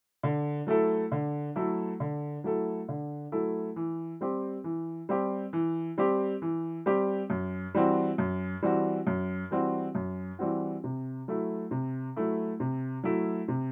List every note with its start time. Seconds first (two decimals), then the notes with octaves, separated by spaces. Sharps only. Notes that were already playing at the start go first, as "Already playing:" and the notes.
0.23 D3
0.67 F#3 A3 E4 A4
1.12 D3
1.56 F#3 A3 E4 A4
2.00 D3
2.44 F#3 A3 E4 A4
2.89 D3
3.32 F#3 A3 E4 A4
3.76 E3
4.21 G3 C4 G4
4.64 E3
5.09 G3 C4 G4
5.53 E3
5.98 G3 C4 G4
6.42 E3
6.86 G3 C4 G4
7.30 F#2
7.75 E3 G3 C4 F#4
8.18 F#2
8.62 E3 G3 C4 F#4
9.07 F#2
9.51 E3 G3 C4 F#4
9.95 F#2
10.39 E3 G3 C4 F#4
10.84 C3
11.28 F#3 A3 E4
11.71 C3
12.16 F#3 A3 E4
12.60 C3
13.04 F#3 A3 E4
13.48 C3